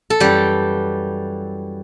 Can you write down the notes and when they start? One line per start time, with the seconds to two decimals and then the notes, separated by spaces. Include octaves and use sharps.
0.10 A4
0.20 F#2 E3 G3 G4